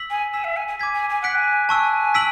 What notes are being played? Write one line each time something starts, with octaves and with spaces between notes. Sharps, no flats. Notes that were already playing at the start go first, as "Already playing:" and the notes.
Already playing: E6 B6 F#7
G#5
G#5 E6 B6 E7
E5
G#5
G#5
G#5 D6 G#6 B6
G#5
G#5
F#5 F#6 B6 D7
G#5
G#5 A5 C#6 E6
E6 B6 D7 F#7